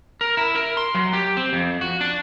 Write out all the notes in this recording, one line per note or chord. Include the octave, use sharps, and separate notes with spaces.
A#4
E4
A#4
C6
F#3
G4
C4
F2
F#4
D4